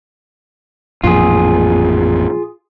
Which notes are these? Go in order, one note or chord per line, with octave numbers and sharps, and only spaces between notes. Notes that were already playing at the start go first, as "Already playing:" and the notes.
A1 F2 A#2 F4 G#4